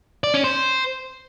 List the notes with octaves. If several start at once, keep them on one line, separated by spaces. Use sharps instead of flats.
D5
C#4
C5